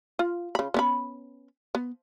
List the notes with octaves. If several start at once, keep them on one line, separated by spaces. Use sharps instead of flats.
F4
C#3 B5
B3 C#4 B5
B3